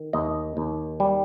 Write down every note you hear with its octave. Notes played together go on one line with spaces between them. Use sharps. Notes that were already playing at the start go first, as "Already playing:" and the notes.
Already playing: D#3
D#2 D#5
D#2
G3